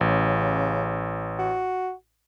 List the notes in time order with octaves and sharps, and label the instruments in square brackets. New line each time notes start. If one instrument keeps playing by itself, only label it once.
[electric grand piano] A1 [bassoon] C#3
[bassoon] F#4